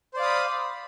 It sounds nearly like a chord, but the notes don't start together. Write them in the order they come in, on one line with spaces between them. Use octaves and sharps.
C5 D5 F5 D#6 B5